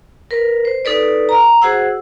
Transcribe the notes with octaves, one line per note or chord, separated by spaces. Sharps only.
A#4 B4
C5
D#4 A4 B4 D5
A#5
F#4 G#4 C5 F#5 E6